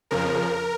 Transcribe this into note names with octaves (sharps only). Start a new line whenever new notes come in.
F2 C#3 F3 A#4